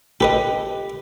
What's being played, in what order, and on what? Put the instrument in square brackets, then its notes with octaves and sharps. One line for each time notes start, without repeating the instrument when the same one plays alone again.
[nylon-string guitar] G4 [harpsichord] A4 B4 D#5